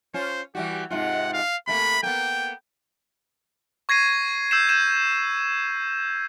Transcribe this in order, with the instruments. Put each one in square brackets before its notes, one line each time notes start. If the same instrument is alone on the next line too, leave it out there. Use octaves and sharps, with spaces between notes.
[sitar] C#4 F4 [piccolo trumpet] C5
[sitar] E3 G3 F#4 [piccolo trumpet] G4
[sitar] G#2 C3 F4 [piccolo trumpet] F#5
[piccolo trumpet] F5
[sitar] C3 A3 A#3 [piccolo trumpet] B5
[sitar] A#3 B3 [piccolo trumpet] G5
[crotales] C#6 G#6 A#6 C7 D#7
E6 G6 C7 E7
G6 D#7 E7